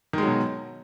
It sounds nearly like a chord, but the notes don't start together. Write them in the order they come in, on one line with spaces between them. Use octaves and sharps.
D#3 G#3 F#3 B2